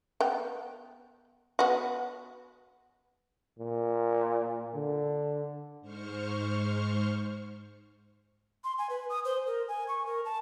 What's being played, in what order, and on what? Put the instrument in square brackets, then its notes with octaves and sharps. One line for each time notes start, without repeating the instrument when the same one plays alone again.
[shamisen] B3 G5
B3 F#4
[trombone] A#2
D3
[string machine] G#2 C5 C#6 F6
[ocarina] C6
G#5
B4
D#6
C5
A#4
G#5
C#6
A#4
A5